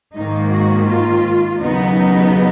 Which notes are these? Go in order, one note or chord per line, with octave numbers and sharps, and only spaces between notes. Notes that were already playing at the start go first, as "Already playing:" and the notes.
G#2 D#3 A#3 D#4
F#4
F4
D#2 C#3 F#3 B3 D#4
D#4